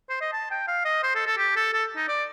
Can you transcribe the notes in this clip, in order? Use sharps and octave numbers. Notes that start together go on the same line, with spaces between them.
C5
D#5
A5
G5
F5
D#5
C5
A4
A4
G4
A4
A4
D#4
D5